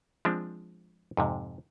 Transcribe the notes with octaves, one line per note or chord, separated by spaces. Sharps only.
F3 G#3 C4 D4
F2 G#2 C3